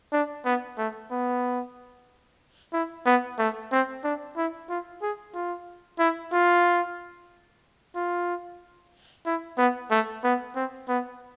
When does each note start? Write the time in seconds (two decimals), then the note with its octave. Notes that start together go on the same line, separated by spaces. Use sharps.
0.12 D4
0.45 B3
0.78 A3
1.11 B3
2.73 E4
3.06 B3
3.38 A3
3.72 C4
4.04 D4
4.37 E4
4.69 F4
5.02 G#4
5.34 F4
5.99 E4
6.33 F4
7.95 F4
9.26 E4
9.58 B3
9.91 A3
10.24 B3
10.55 C4
10.88 B3